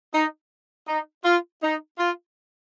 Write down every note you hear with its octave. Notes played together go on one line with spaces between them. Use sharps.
D#4
D#4
F4
D#4
F4